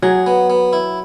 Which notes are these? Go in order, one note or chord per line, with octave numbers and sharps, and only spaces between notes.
F#3 G#4
B3
B3
E4